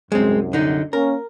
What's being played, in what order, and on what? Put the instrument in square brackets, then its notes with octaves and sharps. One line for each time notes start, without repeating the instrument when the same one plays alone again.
[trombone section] C2 F#2 [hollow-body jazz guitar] G#3 C4
[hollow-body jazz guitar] D3 D#4
[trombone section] A#3 C#4 [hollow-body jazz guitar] A#4